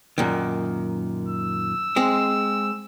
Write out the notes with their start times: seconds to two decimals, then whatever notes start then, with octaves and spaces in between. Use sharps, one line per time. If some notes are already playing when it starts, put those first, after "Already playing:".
0.18 F#2 A#2 D#3
1.28 E6
1.96 G#3 C4